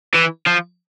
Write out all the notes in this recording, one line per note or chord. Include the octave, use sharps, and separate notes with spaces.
E3
F3